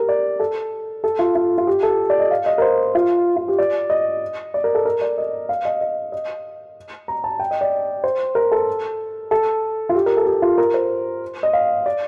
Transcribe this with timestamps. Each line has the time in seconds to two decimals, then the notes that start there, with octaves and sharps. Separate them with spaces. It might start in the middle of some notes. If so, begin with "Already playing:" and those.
Already playing: G4 A#4
0.09 D5
0.40 A4
1.04 A4
1.19 F4
1.35 F4
1.58 F4
1.67 G4
1.83 A4
2.10 D5
2.20 D#5
2.31 F5
2.46 D#5
2.58 A#4
2.62 C5
2.95 F4
3.36 F4
3.48 G4
3.58 D5
3.90 D#5
4.54 D5
4.64 A#4
4.75 A4
4.86 A#4
5.01 D5
5.18 D#5
5.49 F5
5.65 D#5
5.81 D#5
6.12 D#5
7.08 A#5
7.24 A5
7.39 G5
7.51 D#5
7.61 D5
8.04 C5
8.35 A#4
8.52 A4
9.31 A4
9.89 F4
9.95 G4
10.06 A#4
10.17 A4
10.26 G4
10.42 F4
10.58 A#4
10.74 C5
11.43 D#5
11.53 F5
11.86 D5